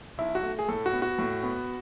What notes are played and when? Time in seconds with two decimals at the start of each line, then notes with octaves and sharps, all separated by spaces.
0.18 B1 E4
0.35 F#4
0.43 A3
0.59 G#4
0.69 A2 A4
0.86 F#4
0.93 B3
1.02 F#4
1.19 A2
1.43 B3